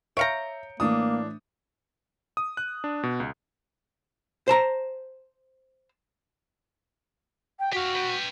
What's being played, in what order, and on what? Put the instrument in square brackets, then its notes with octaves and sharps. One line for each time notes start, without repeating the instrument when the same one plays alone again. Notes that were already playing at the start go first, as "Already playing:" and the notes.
[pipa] C#5 F5 A#5 [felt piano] E5 [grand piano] G6 C#7 D7
[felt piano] A2 E3 [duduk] A#3 [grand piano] D4 D#6
[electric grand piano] D#6
F#6
D4
B2
C#2
[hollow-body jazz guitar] C5 A5 A#5
[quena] G5
[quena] F#4 [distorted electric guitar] G4 F5
[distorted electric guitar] B4 G5